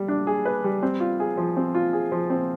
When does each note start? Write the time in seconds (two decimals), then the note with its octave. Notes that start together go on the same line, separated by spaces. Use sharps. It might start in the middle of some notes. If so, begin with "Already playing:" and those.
Already playing: G3
0.08 D4
0.27 G#4
0.45 B4
0.64 G3
0.83 C4
1.00 F4
1.20 G#4
1.37 F3
1.57 C4
1.75 F4
1.93 G#4
2.12 F3
2.30 C4